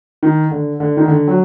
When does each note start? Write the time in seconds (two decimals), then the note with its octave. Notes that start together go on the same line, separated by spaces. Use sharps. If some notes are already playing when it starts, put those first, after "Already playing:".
0.23 D#3
0.51 D3
0.80 D3
0.97 D#3
1.08 D3
1.27 F#3